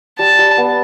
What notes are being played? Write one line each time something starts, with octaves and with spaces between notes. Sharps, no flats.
G3 A5
G3
B3